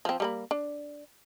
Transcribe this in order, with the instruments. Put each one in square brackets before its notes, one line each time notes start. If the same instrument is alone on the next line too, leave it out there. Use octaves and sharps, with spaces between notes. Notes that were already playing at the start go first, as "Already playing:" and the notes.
[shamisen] F3 C4
G3 A#3 B5
D4